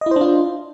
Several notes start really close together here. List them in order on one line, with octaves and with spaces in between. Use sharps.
D#5 E4 C5 D4 F4